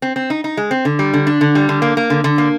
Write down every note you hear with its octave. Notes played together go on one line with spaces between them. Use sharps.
C4
C4
D#4
D#4
G#3
C4
D3
G3
D3
D4
D3
G3
D3
A#3
A#3
D3
D3
A#3